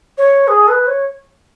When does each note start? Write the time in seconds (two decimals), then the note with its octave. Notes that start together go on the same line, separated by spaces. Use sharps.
0.18 C#5
0.47 G#4
0.68 B4
0.87 C#5